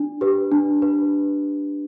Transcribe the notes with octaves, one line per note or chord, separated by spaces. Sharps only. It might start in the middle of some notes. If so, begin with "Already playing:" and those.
Already playing: D4
G4 B4
D4
B4